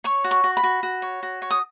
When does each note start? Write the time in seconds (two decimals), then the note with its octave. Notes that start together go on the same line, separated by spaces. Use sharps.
0.04 C#5 C#6
0.24 F#4
0.31 C#6
0.44 F#4
0.57 B5
0.63 F#4
0.83 F#4
1.02 C#5
1.23 F#4
1.42 C#5
1.51 D#6